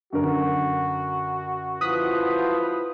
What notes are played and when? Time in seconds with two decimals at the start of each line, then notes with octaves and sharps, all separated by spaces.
0.13 F#2 D3 F#4 A#4
1.81 F3 E4 B4 D#6 F#6 B6